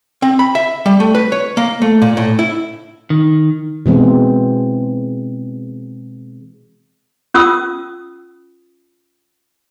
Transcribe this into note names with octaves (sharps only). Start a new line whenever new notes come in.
C4
B5
E5
G3
A3
B4
C#5
A#3
A3
A#2
A2
E4
D#3
B2 E3 G#3 C4
C#4 F4 D#6 E6